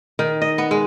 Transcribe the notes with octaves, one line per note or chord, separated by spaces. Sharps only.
D#3
D#5
B3
G#3